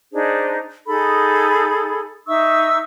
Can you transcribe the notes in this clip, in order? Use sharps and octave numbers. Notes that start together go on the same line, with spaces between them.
D4 D#4 G#4 C5
D#4 G#4 A4 B5
D#4 E5 C#6 E6